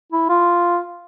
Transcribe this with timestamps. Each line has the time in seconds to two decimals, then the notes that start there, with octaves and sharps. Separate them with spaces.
0.12 E4
0.29 F4